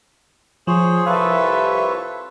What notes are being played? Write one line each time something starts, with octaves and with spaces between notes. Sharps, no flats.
F3 G#4 C5 C#5
C2 F4 A4 B4 C#5 E5 F5 A5